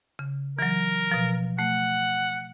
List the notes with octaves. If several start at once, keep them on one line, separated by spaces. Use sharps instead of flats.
C#3
E3 F#3 A#4
B2 F3
A3 F#5